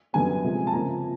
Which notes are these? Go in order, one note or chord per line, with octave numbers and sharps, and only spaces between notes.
F#2 D3 G3 B3 G#5
C3 F3 G#3
A5
C#3 F3 A#3 A#5